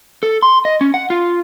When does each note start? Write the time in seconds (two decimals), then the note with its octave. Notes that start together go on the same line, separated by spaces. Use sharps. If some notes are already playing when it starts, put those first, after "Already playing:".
0.23 A4
0.42 C6
0.65 D#5
0.81 C#4
0.94 F#5
1.10 F4